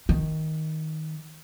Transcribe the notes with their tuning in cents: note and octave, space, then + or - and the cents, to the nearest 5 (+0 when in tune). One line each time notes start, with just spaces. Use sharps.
D#3 +15